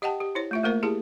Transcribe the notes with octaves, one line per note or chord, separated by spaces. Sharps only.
G4 D#5 F#5 G5 A5
G4
E4 C5 C#5
A3 F4 E5
A3 A#3 F4 A#4 C5
E4 G4 G#4 A5